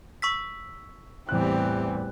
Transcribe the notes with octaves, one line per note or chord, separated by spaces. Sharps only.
C#6 E6 B6
E2 A2 E3 G3 C4 G4 F#6